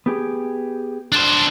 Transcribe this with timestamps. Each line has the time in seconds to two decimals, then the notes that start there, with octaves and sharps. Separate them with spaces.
0.06 B3 G4 G#4
1.12 D4 C5